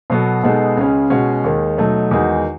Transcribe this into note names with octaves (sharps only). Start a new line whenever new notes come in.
B2 F#3 B3 F#4 A4
B2 G#3 B3 D#4 A4
C#2 C#3 G#3 C#4
B2 G#3 C#4 F#4
D#2 D#3 G#3
B2 F#3 A3 D#4
E2 D#3 G#3 D#4 F#4